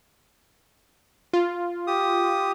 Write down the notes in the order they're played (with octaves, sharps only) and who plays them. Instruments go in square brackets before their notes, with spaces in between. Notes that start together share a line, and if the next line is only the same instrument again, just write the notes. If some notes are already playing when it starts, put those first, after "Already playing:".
[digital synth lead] F4
[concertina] G4 D#6